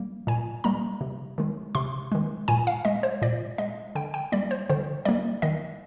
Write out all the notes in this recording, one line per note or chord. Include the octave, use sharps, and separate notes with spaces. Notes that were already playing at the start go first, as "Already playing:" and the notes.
Already playing: G3 A#3
A#2 G#5
G3 A#3 A#5
C3
D#3 G#3
C3 C6
D#3 G#3
A#2 G#5
F5
G#3 D#5
C5
A#2 D5
G#3 D#5
D3 G5
G5
G3 A#3 D5
C5
D3 C5
G3 A#3 D5
D#3 D#5